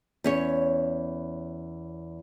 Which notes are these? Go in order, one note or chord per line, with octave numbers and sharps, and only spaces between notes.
E2 C#4 C#5